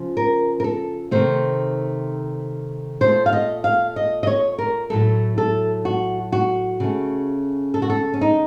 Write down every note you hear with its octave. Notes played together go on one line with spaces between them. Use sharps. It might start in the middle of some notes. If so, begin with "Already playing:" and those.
Already playing: C#3 F3
A#4
A#4
A4
C3 D#3 A3 C5
A#2 A3 C5
F5
D#5
F5
D#5
D#5
C#5
A#4
A2 F#3 A3 A4
A4
F#4
F#4
C#3 A3
A4
F#4
A4
C#4
D#4